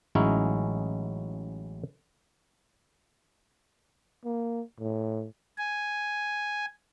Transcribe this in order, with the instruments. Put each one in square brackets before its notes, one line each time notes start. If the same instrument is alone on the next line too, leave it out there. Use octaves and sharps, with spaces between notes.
[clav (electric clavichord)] A1 F#3 G#3 C#4 D#4 E4
[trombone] A#3
A2
[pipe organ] G#5